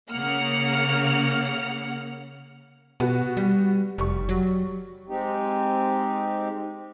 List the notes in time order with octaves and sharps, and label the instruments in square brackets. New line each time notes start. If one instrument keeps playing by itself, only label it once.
[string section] C#3 A#3 F#5 F6
[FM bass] B2 [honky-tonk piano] B3 F#4
[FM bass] G3
[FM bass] F1 [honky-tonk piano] G3 C#6
[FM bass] F#3
[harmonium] G#3 C4 D#4 G4